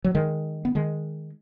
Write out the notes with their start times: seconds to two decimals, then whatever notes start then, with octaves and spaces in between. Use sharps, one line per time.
0.04 F#3
0.15 D#3 G#3
0.65 B3
0.75 D#3 G#3